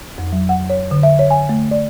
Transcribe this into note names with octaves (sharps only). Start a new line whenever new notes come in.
F2
F#3
F#5
C#5
D3
E5
C#5
G#5
A3
D5